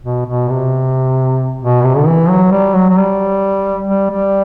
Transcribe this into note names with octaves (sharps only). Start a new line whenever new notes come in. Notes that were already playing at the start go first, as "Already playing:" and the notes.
B2
B2
C3
B2
C3
D3
E3
F#3
G3
F#3
F#3
G3
G3
G3